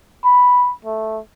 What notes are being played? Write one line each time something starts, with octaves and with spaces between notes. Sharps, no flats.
B5
A3